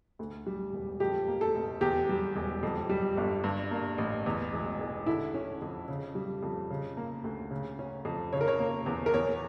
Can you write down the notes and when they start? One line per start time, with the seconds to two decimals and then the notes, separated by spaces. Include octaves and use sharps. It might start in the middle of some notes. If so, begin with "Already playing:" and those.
0.19 D2
0.46 G3
0.73 E1
1.00 F2 G4
1.28 A#3
1.41 A4
1.54 F1
1.81 E2 G4
2.09 G3
2.36 E1
2.63 F2
2.89 G3
3.17 G1
3.44 G2
3.71 A#3
3.98 A1
4.26 E2
4.53 E1
4.80 E1
5.06 D3 E4
5.34 C#4
5.62 F2
5.88 C#3
6.15 G3
6.43 F2
6.70 C#3
6.97 A#3
7.24 D2
7.51 C#3
7.79 C#4
8.05 F2
8.33 C#3 C#5
8.41 A#4
8.48 C#5
8.59 A#3
8.86 E2
9.06 A#4
9.13 E2 C#5